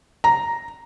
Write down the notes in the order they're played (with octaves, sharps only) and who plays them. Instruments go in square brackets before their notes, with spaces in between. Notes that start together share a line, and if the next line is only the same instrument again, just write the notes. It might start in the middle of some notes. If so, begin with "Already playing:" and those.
[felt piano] A#5